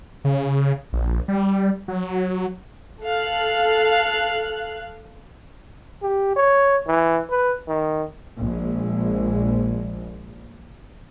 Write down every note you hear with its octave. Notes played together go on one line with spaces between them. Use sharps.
C#3
A#1
G3
F#3
A4 F5 F#6
G4
C#5
E3
B4
D#3
A#1 G#3